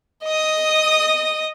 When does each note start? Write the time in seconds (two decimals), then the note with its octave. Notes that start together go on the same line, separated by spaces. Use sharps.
0.24 D#5 D#6